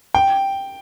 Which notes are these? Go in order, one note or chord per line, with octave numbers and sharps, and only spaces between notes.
G5